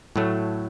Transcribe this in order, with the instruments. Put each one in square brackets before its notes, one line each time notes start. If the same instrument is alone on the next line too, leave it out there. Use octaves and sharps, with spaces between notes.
[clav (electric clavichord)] A2 F#3 A3